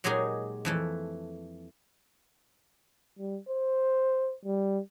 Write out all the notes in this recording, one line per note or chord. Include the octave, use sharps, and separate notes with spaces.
A#2 F#3 G#3 D#4 G4 G#4
F2 E3 A3
G3
C5
G3